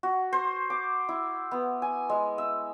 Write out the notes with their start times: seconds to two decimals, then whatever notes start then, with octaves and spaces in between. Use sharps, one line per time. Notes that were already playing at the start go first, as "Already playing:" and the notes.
0.03 F#4
0.33 C5
0.70 D6
1.09 E4
1.51 B3
1.82 G#5
2.09 G#3
2.38 E5